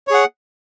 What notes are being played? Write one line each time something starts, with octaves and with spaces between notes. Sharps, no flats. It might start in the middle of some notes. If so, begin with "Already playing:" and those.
G#4 C#5 F#5